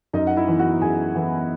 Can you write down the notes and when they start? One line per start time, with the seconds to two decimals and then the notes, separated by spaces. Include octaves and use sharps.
0.13 F#2 D#4 D#5
0.27 F#5
0.37 E4 E5
0.48 E3 B3
0.59 F#4 F#5
0.81 F#2 G#4 G#5
1.15 E3 B3